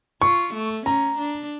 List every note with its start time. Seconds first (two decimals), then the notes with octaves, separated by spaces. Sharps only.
0.22 F4 C#6
0.54 A3
0.86 C#4 A#5
1.18 D4